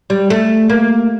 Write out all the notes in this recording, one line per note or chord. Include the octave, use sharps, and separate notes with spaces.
G3
A3
A#3